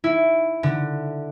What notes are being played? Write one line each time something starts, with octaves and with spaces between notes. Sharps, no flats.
E4
D3